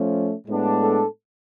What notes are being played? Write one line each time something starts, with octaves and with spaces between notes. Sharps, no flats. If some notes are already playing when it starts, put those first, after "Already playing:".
Already playing: F3 A3 C#4
A2 G#3 B3 D4
A4